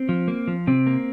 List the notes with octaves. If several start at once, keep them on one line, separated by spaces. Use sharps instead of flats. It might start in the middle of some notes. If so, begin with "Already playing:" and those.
Already playing: C4
F3
A#3
F3
C3 C4
A#3